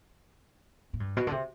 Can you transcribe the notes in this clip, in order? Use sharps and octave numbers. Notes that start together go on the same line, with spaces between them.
A2
G2
B2
D3
C3